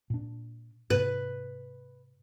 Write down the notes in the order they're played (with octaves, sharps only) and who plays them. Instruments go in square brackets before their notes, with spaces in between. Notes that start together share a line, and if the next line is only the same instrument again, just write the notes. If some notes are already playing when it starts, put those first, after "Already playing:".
[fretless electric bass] A#2 D4
[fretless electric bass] G#2 C3 [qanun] B4